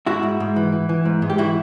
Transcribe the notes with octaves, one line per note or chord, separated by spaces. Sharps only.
G#2 E4 F#4
G#2
G#2
E3
E3
E3
G#2
G#2
G4
E3 E4 F#4